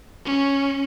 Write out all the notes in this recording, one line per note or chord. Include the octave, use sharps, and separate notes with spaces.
C#4